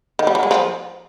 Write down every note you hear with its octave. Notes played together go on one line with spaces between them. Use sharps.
D#3
G3
F#3
G#3
F3